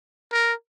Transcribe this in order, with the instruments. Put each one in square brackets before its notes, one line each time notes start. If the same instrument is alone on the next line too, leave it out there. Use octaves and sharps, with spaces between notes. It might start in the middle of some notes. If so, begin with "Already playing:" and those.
[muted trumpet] A#4